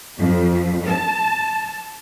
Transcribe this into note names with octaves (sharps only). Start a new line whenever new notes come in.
F2
A5